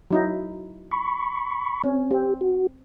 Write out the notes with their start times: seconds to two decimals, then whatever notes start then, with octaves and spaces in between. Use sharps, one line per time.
0.11 F#3 D#4 E4
0.91 B5 C#6
1.84 C4 C#4
2.11 C4 G4
2.41 F#4